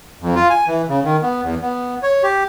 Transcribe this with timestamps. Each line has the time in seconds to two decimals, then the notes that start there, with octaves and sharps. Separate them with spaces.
0.22 F2
0.36 F4
0.50 G#5
0.68 E3
0.89 C#3
1.04 D#3
1.22 B3
1.43 E2
1.62 B3
2.03 C#5
2.23 G4